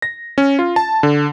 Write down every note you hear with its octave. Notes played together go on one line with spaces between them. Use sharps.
A#6
C#4
F4
A5
D3